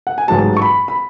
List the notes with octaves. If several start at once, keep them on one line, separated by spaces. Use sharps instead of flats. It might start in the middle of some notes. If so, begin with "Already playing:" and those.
F#5
G#5
A1 G#2 F#3 A5
C#6
B5
B5